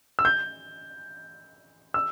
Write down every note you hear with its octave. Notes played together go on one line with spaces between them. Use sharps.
E6
G6
E6